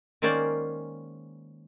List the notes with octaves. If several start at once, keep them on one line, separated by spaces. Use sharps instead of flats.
D#3 G#3 A#3 C#4 C5 D5